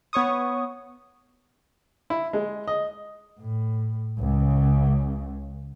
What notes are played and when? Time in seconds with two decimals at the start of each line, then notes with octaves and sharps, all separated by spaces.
0.13 B3 C#5 C#6 D#6
2.10 E4
2.33 G#3
2.67 D#5
3.40 A2
4.19 C#2 C#3